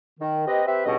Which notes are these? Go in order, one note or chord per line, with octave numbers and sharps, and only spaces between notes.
D#3
C4 G4 B4 D#5
C4 G4 B4 E5
C#2 G2 B2 B3 D#5